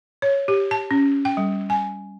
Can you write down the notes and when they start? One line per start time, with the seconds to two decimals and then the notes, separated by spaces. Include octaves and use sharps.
0.22 C#5
0.48 G4
0.71 A5
0.91 C#4
1.25 G5
1.37 G3
1.70 G#5